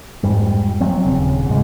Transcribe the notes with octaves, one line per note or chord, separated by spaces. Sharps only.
F2 G#2 G3
F3 F#3 C4
D#1 C#3
G#2 C#3 G#3